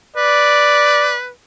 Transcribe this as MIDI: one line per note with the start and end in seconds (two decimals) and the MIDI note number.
0.16 1.29 71
0.16 1.15 74